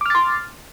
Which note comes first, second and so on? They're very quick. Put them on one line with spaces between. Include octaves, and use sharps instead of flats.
D6 F6 A6 C6